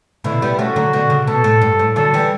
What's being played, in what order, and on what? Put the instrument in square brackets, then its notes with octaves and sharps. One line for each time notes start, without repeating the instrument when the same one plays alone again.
[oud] B2 D3 [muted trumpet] E4
[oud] G3 B3
[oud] A3 C#4 [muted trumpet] F#4
[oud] D3 F#3
B2 D3
C#3
[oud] B2 [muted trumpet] A4
[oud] A2
G2
A2
[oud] D3 F#3 [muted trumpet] A4
[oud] E3 G3